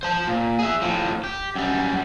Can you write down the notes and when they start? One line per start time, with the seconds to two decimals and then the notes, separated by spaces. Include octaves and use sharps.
0.03 C5 A5
0.27 A#2
0.59 G#4 E5
0.82 A2 F3
1.24 G4
1.55 F#2 G3